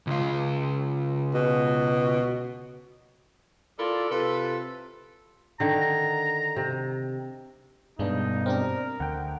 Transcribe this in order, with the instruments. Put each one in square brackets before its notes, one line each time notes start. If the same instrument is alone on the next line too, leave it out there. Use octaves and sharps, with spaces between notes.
[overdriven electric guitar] C#2 F4
[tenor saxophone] B2
[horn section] E4 F4 A4 A#4 D5
C3 F4 A4 B4
[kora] D3 D#3 [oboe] A#5
[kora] C3
[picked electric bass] G2 B2 [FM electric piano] G#3 D4 [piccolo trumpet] D#4
[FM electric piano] C4 D4 G4 [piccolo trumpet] A#4
[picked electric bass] D2 [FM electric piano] F#5 G5